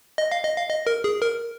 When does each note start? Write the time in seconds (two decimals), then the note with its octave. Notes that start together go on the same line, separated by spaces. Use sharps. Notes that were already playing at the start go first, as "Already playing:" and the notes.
0.18 D#5
0.32 F5
0.44 D#5
0.57 F5
0.69 D#5
0.87 A#4
1.04 G#4
1.22 A#4